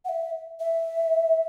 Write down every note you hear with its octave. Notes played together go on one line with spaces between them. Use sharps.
F#5
E5
E5